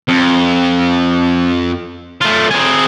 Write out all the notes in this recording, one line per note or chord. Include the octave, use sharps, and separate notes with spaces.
F2
A3 F4
C4 G#4